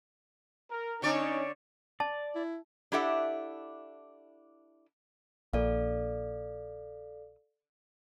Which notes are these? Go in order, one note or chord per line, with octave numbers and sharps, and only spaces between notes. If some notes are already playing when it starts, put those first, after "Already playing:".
A#4
D3 C#4 D#4 C#5 D5
D5 A5
E4
D4 E4 G4 A4 E5 F#5
A#1 A#2 A4 D5 F5